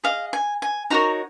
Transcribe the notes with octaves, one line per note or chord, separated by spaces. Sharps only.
G#4 D#5 F5
G#5
G#5
D#4 F#4 A#4 C#5 A#5